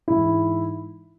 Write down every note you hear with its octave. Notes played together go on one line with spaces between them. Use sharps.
G#2 E3 E4